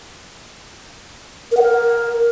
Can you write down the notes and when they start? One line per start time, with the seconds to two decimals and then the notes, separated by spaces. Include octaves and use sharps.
1.52 A#4
1.57 F#5
1.62 A#4